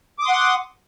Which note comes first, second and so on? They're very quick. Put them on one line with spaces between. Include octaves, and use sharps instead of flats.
D6 D#6 C6 F#5